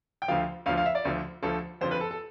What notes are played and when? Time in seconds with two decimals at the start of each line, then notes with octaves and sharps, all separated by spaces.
0.22 G5
0.28 D2 D3 F3 F5
0.66 D2 D3 F3 F5
0.77 F5
0.86 E5
0.95 D5
1.05 D2 D3 F3
1.43 D2 D3 F3 A4
1.81 F2 D3 F3 C5
1.91 B4
2.00 A4
2.11 A4